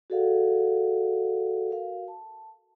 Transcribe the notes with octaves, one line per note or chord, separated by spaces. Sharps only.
F#4 G#4 A4 D5 F5 F#5
F#4 A#4 F5
A5